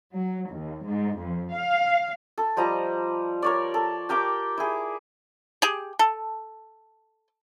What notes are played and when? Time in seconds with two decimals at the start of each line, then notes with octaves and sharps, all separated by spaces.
0.13 F#3
0.51 D#2
0.85 G#2
1.17 F2
1.54 F5
2.38 A4
2.57 F3 G3 D#5 A#5
3.42 A#4 C#5 D5
3.74 A4
4.09 G4 A#4 G5 D6
4.58 E4 G#4
5.62 G4 G#4
5.99 A4